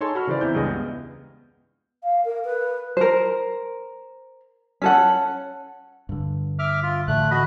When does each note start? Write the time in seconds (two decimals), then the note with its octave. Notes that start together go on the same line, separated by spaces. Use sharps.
0.01 D#4 G#4 A4 C#5 G#5 C6
0.15 F#4 B5 F6
0.27 C#3 E3 B4 C5 D5
0.41 E2 C4 E4 G6
0.54 C#2 G2 G#4 D#5
0.69 B3
2.03 F5
2.25 A#4
2.44 B4
2.97 A#4 C5
4.82 C#4 A4 F#5
6.09 G2 D3
6.59 E5 D6 F6
6.83 F4
7.08 A2 D3 E3 A3 F#6
7.31 F#4 D#5 B5